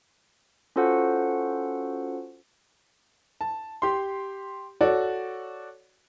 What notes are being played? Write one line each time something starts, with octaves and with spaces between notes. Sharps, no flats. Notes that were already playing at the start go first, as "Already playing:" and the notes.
C#4 F4 F#4 A4 C5 F#5
A5
G4 C6
F#4 A4 C#5 D5